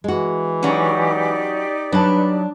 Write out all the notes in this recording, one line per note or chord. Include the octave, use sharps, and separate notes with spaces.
E3 G#3 F#4
F#3 C#4 D#4 G4 D5
F#3 D4 B4 A5